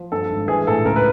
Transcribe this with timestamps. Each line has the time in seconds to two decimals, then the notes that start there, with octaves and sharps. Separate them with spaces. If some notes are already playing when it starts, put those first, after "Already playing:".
Already playing: F3
0.12 G2 A4
0.30 G#1
0.48 E3 G#4
0.67 A2 A4
0.85 C#2 A#4
0.96 B4